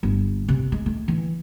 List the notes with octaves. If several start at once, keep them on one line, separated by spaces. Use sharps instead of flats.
G1
C3
G#3
A3
E3